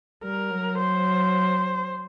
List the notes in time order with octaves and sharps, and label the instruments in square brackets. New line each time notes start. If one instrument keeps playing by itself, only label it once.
[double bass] G3 [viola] A#4
[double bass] F#3
[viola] C5